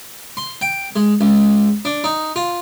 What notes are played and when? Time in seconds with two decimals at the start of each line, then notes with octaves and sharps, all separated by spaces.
0.37 C6
0.61 G5
0.96 G#3
1.21 C#2
1.85 D4
2.04 D#4
2.36 F4